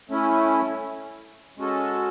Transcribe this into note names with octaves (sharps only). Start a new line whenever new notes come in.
A3 C#4 E4
G#3 C#4 F#4 A4